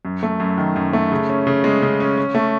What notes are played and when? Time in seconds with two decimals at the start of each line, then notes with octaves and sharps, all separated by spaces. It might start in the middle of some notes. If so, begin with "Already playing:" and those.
0.05 F#2
0.23 A3
0.40 F#2
0.58 D#3
0.76 F#2
0.93 A3
1.12 C#3
1.29 C#4
1.47 C#3
1.64 G#3
1.82 C#3
2.00 C#4
2.18 C#4
2.35 A3